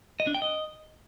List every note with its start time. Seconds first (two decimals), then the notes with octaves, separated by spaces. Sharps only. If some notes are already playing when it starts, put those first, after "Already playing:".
0.20 D#5
0.27 D4
0.34 G5
0.42 D#5